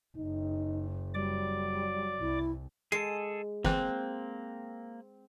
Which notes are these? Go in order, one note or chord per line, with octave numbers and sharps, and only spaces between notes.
F#1 D#4
F#3 G3 D5 D6
C2 E4
G#3 G#4 A4 C7
G1 E3 A#3 C4 F#6